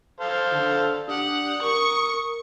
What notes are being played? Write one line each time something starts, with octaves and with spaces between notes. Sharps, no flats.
A4 C5 F5
D3
D4 G4 F#5 D#6
A#4 C#6